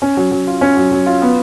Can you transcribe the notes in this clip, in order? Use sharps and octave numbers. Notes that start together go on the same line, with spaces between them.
C#4
F#3
F#3
F4
C#4
F#3
F#3
F4
B3